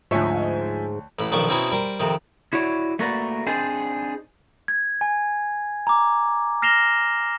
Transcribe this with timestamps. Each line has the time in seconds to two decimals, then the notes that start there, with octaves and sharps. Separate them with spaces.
0.11 D2 G#2 F3 C#5 E5 G#5
1.19 A1 A2 B5
1.32 B1 D#3 F3 D4 C#6
1.49 B2 C4 C#4 D#4 E4
1.71 G3 A#4 C5
2.00 F2 C3 D#3
2.53 E4 F#4 C#5 D5
2.99 A3 A#3 F#4 A#4 B4 D5
3.46 C4 D4 D#4 G#4 C5 D5
4.68 G#6
5.01 G#5
5.87 A#5 D6
6.62 F6 A#6 C7 E7 F7 G7